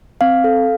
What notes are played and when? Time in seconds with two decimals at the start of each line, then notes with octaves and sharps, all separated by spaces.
0.21 C4 F5
0.44 A4